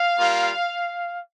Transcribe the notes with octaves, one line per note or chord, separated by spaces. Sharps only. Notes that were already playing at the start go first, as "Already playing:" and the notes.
Already playing: F5
G3 A#3 F4